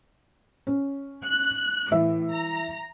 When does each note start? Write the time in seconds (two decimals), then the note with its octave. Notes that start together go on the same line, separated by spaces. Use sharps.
0.67 C#4
1.24 F#6
1.92 A2 E3 E5
2.31 A#5